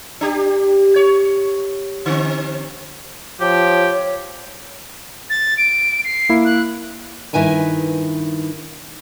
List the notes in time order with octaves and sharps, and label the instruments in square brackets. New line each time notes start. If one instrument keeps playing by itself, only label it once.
[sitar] D4 G4
C#5
D3 C4
[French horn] F3 [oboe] G4 [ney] C#5
[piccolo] A6
D7
C7
[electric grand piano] A#3 E4
[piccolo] F#6
[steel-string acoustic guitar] G2 D#3 E4 B4 G#5 A#5